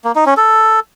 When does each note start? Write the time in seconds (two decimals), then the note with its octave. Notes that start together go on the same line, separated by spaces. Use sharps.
0.04 A#3
0.15 D#4
0.26 C#4
0.37 A4